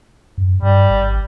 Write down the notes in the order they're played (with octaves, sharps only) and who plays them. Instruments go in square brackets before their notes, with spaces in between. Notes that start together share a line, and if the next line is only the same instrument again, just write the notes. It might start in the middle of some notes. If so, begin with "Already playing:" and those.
[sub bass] F#2
[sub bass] G2 [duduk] G3
[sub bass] G#1